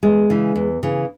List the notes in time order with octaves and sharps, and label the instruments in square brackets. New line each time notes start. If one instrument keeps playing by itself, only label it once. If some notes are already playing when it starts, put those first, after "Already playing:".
[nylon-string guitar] E2 G#3
C#3 E3
E2
C#3 E3